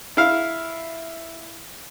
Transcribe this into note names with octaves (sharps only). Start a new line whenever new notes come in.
E4 F5